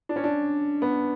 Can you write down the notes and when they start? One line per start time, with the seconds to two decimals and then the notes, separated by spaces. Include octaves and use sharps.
0.09 D4
0.16 C#4
0.24 D4
0.82 B3